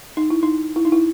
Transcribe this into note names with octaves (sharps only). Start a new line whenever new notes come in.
D#4
E4
D#4
E4
D#4
E4